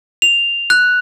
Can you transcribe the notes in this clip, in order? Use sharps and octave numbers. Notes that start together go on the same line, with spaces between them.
F7
F#6